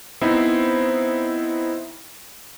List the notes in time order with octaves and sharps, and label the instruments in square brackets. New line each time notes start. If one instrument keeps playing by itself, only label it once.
[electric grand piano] B3 C4 D#4 E4 C5